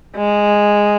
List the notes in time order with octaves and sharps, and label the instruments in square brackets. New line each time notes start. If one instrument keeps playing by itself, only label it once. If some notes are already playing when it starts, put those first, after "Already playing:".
[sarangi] G#3